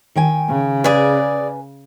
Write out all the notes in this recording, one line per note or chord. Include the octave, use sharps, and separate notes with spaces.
D#3 G5 G#5
C#3
G#4 B4 D5 G#5